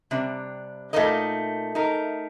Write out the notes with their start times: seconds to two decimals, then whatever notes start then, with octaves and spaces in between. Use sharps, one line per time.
0.11 C3 G3 D4
0.93 A#2 A3 D#4 A#4 D#5
1.75 A3 D#4 A#4